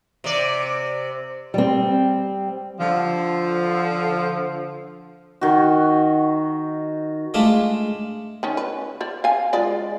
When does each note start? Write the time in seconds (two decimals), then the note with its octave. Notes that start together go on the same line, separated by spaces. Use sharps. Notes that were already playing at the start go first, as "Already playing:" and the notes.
0.24 C3 D5
1.54 G3 C4
2.80 D3 F3
5.41 D#3 F#4
7.34 G#3 A3 D4 F4
8.43 D#3 C#4
8.57 B4
9.01 C5 D5
9.24 F5 G#5
9.53 G#3 F4 D5